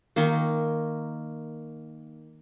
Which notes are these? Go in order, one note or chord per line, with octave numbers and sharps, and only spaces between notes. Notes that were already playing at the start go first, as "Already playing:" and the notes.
D#3 A#3